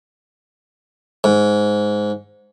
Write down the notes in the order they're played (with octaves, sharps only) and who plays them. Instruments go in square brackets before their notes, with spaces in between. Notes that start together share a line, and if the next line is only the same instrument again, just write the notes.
[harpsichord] G#2